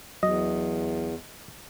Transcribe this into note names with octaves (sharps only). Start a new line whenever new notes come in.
E2 F#3 D#5